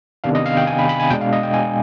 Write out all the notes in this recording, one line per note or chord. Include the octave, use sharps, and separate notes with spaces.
C3 D#3 B3 D4 F5
D#5
F5
G5
G#5
B5
B5
G#5
B2 G#3 D4 G5
F5
D#5
G5
G#5